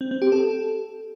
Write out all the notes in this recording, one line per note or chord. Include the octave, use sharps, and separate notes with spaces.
C4
C4
G4
A4